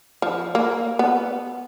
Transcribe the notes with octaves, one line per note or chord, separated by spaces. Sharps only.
F3
A#3
B3